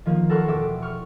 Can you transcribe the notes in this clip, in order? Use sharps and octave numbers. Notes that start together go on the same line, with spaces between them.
D#3 F3 A#3
A4 A#4 F#5 C6 C#6
E1 A4 E5 D6
C#6 F6